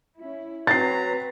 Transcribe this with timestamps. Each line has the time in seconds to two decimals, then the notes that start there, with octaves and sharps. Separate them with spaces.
0.17 C#4 E4
0.67 F#3 C4 F#4 B4 A#5 A6 C7